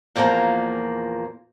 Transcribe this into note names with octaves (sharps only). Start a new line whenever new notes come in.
E2 A#2 F3 G3 A#3